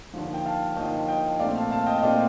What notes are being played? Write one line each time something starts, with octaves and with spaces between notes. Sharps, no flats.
D#2 D3 F3
G5
F5 A5
D#2 D3 F3 D#5 G5
D#5 G5
A#2 A3 C4 D5 F5
F5 A5
F5 A5
D#5 G5
D#5
A#2 A3 C4 D5 F5